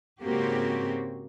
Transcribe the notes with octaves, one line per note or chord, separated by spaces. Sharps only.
G#2 C#3 A#3 C4 F#4 G4